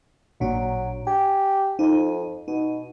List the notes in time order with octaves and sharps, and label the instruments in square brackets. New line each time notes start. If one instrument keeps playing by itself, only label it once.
[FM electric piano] A1 A#2 D4 [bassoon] F#3
[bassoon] G4 [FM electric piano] G#5
[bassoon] F2 [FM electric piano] D#4
[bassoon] B2 [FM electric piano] D#4